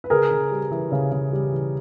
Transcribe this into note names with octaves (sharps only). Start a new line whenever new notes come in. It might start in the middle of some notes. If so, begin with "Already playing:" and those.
B4
C#3 G#4 A#4
C#3
G3
E3
C#3
C#3
G3
E3